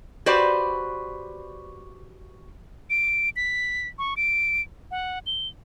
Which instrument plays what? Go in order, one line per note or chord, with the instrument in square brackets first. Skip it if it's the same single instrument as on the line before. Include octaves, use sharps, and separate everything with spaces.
[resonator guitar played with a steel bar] F#4 G4 B4 C5 D5
[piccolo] D7
B6
C#6
D7
F#5
G7